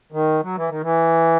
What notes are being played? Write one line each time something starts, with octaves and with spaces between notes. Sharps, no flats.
D#3
F#3
E3
D#3
E3